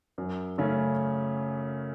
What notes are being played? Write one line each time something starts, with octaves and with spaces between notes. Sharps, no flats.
F#2
C#3 A3 C#4